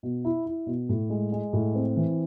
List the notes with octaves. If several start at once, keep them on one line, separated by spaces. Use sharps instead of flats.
B2
E4
E4
B2
A2
G#3
G#3
A2
C4
E3